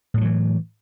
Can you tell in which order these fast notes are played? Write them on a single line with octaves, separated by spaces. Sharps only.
A2 G3 F#3 E3